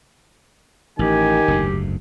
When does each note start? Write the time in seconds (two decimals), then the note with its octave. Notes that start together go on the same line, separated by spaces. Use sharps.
0.99 A1 D#3 G4 G#5
1.48 F#1 D2 G#2